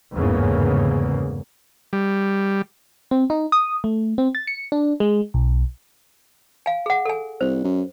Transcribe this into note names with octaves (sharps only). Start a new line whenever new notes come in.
G1 E2 G#2 C#3 A#3
G3
C4
D#4
D#6
A3
C4
A6
C#7
D4
G#3
B1
F5 G#5
G#4 F#5
A4 G#5
C2 C5
F#2